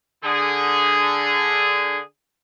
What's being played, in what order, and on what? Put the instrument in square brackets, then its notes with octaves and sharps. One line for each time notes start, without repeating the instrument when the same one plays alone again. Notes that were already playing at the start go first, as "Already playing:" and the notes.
[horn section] D3 G#4